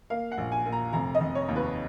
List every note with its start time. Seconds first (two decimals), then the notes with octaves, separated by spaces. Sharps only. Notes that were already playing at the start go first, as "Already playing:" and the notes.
0.10 A#3 F5
0.32 F#5
0.38 A#1
0.52 G#5
0.66 A#2
0.72 A#5
0.93 F1 A#5
1.15 D#5
1.21 F1
1.35 C#5
1.48 D#2
1.56 B4